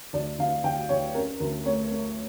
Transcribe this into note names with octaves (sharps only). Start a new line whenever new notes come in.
D2 D5
D2 F5
D2 G5
D2 C#5
C#4 A#4
D2 A#4
A3 C#5
A3